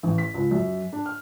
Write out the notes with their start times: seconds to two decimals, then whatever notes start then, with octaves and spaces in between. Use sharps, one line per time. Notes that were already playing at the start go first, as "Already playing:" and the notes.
0.03 A1
0.18 B6
0.34 C#2
0.51 F#2
0.92 D4
1.06 F6